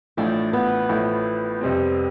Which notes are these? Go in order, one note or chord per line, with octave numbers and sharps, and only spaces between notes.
A1 A2 F3 A3 D4 E4
B3
A1 A2 F3 A3 E4
F2 C3 G3 C4